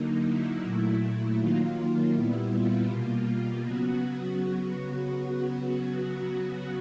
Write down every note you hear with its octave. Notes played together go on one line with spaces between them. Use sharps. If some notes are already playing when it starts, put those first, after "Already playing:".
Already playing: D3 F#3 A#3 D#4
E4
A#2 F#3 A3
D#3 F#3 A#3 F4
F4
A#2 G3 B3 E4
F4
B2 G3 A#3
C#3 F#3 B3 F#4